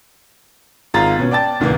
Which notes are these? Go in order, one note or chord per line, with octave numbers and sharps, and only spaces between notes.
G#1 F4 G#4 A#5 A6
B2 C#4
D5 G5 A5 A6
D1 C2 D#3 E3 A#3